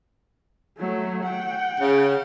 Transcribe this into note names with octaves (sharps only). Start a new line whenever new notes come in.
F#3 A3
F#5 G5
C#3